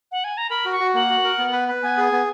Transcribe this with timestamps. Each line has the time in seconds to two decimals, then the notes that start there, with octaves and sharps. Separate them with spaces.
0.12 F#5
0.24 G#5
0.38 A#5
0.50 A#4 B5
0.65 F#4
0.72 C#6
0.80 F#4
0.94 A#3 F#5
1.09 F#4
1.24 A#4
1.39 B3
1.53 B4
1.68 B4
1.83 B3 G#5
1.98 G#4
2.12 B3